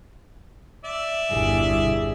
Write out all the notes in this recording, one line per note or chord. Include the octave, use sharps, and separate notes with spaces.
D5 E5
G1 E2 B2 G3 E4 G#4